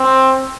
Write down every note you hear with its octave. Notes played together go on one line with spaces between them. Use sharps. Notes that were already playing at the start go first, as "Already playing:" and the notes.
Already playing: C4